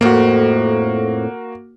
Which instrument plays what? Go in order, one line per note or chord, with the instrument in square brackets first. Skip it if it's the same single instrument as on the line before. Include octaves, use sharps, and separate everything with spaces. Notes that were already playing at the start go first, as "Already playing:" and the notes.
[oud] F2 A2 [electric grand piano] A#3 F#4